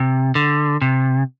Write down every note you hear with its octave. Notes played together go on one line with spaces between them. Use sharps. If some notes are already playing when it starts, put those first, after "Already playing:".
Already playing: C3
D3
C3